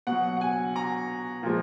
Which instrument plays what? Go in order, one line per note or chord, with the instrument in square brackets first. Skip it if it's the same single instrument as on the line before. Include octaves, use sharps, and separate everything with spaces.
[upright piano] B2 F#5
F#3
F#5
G#5
A#5
A#2 F3 G#3